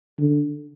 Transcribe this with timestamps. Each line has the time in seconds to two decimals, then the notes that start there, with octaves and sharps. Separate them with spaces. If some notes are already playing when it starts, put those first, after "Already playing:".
0.19 D3